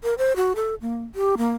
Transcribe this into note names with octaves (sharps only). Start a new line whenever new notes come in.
A#4
C5
F#4
A4
A#3
G4
A#3